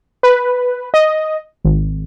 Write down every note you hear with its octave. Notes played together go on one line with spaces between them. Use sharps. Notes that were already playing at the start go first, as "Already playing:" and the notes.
B4
D#5
G#1